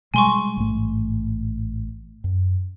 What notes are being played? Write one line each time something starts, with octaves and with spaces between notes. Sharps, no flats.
B2 G3 G#3 G#5 C6 C#6
A1 G#2 A3
F#2